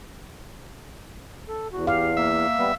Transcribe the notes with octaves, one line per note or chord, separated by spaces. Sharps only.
A4
E2 F#4
G4 F5
A#3 E5
G3 B3